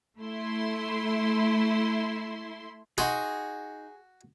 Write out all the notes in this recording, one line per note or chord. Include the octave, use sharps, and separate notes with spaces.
A3 E4 C6
D#4 F#4 G#4 F#5 C6